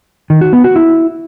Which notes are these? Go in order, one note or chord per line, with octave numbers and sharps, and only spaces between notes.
D#3
F#4
B3
F#4
E4